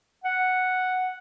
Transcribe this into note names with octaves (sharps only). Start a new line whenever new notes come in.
F#5